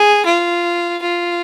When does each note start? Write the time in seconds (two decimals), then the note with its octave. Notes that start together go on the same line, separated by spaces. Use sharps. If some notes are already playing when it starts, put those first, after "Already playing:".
Already playing: G#4
0.25 F4
1.02 F4